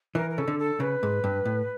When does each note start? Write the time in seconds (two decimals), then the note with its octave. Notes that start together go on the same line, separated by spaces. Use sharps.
0.15 E3 A#4
0.29 A#4
0.37 C#3 A4
0.48 D3
0.59 A4
0.80 C#3 B4
1.03 G#2
1.24 G2
1.45 A2